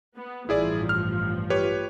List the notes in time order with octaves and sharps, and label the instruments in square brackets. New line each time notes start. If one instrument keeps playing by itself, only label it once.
[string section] B3
[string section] A1 G2 F3 [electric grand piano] E4 G#4 D5
[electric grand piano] F6
G4 B4 C#5